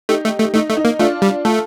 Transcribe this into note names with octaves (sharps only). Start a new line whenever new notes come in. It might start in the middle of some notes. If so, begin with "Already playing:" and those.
A3 D#4 G4
A3
A3
A3 D#4
A3
D#4
A#3
A3 D4 F4
G3
A3 F4 A4